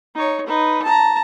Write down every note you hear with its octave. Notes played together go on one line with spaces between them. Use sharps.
D#4 C#5
D#4 B4
A5 A#5